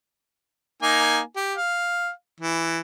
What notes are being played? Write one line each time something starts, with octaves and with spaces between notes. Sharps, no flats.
A#3 D#4 G#5
G4
F5
E3